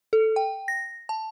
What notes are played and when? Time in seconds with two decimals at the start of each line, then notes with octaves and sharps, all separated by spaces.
0.13 A4
0.36 G5
0.68 A#6
1.09 A5